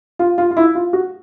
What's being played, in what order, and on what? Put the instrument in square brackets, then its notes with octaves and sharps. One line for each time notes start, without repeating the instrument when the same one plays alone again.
[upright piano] F4
F4
F4
E4
F4
F#4